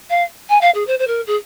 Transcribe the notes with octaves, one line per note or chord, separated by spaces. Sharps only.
F5
G#5
F5
G#4
C5
C5
A#4
G#4